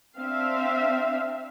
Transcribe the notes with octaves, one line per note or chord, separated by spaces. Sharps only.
C4 D4 E5 F5